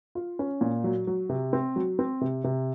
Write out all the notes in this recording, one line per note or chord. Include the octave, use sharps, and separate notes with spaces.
F4
C#4
A#2
F#3
F#3
C3
C4
F#3
C4
C3
C3